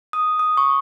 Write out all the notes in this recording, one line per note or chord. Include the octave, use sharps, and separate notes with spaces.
D#6
D#6
C#6